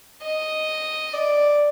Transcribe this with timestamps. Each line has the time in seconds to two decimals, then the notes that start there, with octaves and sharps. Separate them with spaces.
0.23 D#5
1.13 D5